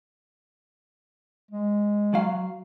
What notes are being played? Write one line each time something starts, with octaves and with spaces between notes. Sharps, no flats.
G#3
F#3 F5